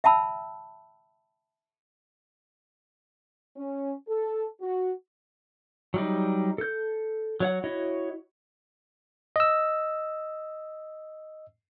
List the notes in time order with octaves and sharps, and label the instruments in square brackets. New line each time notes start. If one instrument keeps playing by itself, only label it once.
[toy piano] E5 G5 A5 B5 E6
[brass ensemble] C#4
A4
F#4
[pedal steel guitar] F#3 G3 D#4
A4 G6
F#3 C#5 F#5
E4 F#4 C#5 D#5
[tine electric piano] D#5 E6